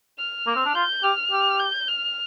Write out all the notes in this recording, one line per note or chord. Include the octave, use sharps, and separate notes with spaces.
F6
A#3
C4
D4
F4 G6
G4 F6
G4
G6
F6